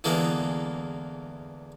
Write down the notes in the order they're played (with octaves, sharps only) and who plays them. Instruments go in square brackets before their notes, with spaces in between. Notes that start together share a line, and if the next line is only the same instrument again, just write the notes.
[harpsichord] E2 D3 E3 G#3 A#3 B3